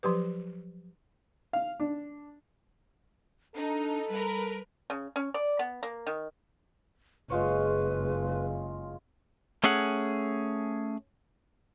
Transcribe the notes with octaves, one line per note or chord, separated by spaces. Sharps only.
F3 F#3 G4 B4
F5
D4
D4 D#4 A4
G3 A#4 B4
C#3
C#4
D5
B3
A#3
D#3
F#1 G#3 F4 B4 C#5
A3 C#4 G#4 F#5